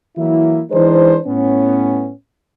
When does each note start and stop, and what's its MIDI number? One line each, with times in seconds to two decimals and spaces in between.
0.17 0.62 52
0.17 0.62 54
0.17 0.62 58
0.17 0.62 64
0.71 1.17 52
0.71 1.17 56
0.71 1.17 62
0.71 1.17 63
0.71 1.17 71
0.71 1.17 72
1.26 2.10 45
1.26 2.10 59
1.26 2.10 61